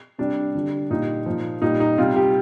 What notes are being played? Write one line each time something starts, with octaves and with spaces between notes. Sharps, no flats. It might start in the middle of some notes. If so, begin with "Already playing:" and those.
C3 G3 D4
D3 G3
A#2 G3 D#4
A#2 F3
A#2 G3 D#4
D#4
C3 G3 F4
G4